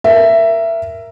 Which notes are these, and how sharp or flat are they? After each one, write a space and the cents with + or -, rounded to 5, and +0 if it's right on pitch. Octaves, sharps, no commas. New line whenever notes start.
A#4 +0 E5 +15